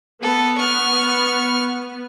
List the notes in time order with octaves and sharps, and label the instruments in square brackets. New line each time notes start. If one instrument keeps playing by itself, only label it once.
[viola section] B3 [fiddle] A4
[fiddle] C#6 F6